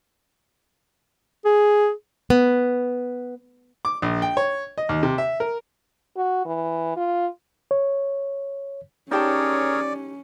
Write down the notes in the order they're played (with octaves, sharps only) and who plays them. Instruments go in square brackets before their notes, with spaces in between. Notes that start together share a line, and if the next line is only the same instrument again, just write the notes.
[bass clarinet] G#4
[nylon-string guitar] B3
[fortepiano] D6
A#1
G5
C#5
D#5
D#2
C3
E5
A#4
[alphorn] F#4
E3
F4
[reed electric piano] C#5
[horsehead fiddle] C#4 [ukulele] D#4 G4 A5 [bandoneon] G#4 A#4 C#5 [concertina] D5